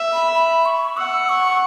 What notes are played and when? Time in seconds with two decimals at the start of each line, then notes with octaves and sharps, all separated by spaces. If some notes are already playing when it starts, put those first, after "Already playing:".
Already playing: E5
0.13 B5
0.34 B5
0.66 C#6
0.97 F#5 E6
1.29 C#6